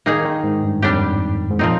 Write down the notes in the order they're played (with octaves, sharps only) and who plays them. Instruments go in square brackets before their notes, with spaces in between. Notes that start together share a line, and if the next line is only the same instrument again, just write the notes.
[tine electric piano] D#3 [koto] A#3 D#4 G#4
[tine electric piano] D#3
G#2
G2
[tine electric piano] F2 [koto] G3 D4 G4
[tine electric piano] G#2
[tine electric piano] A#2 [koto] F3 C4 D#4